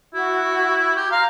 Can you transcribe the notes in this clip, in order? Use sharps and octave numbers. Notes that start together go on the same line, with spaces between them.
E4 F#4
G4
F5 A#5